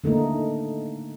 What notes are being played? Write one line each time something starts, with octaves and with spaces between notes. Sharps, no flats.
D3 A3 A#3 D#4